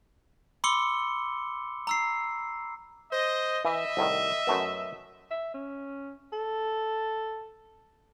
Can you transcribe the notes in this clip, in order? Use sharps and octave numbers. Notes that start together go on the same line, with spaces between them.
B5 C6 D6 E6 C#7 G7
A#5 E6 C7
C5 D#5
E3 D#5 E5
C2 A2 D#3
F#2 A3 B3
E5
C#4
A4